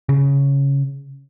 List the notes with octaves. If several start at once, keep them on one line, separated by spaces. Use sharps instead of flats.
C#3